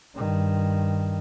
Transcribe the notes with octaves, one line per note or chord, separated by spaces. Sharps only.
G2 D#3